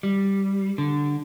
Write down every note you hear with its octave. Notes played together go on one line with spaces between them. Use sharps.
G3
D3